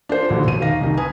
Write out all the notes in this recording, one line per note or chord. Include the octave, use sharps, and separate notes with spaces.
D4 F4 C5
A#1 D#2 B2 D3
E1 D#7
D#3 F5 A#6
C2 D#3
B4 G#5 D#6